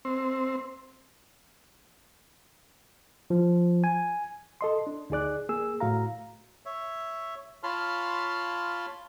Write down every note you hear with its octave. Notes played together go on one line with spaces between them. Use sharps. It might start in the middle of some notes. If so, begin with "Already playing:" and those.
C4
F3
G#5
A4 D#5 C6
D4
D2 D#4 G#4 D5 F#6
A#3 G#4 E6
A2 F#4 F5 A#5
C#5 E5
F4 C#5 A5 B5 C6 F6